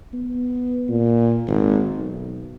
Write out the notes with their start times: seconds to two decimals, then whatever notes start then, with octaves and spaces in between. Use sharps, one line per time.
0.13 B3
0.89 A#2
1.47 G#1
1.97 B1